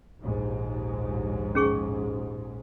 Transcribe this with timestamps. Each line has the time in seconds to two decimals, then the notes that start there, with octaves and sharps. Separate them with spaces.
0.20 A#1 D#2 G#2
1.55 C#4 G#4 C#6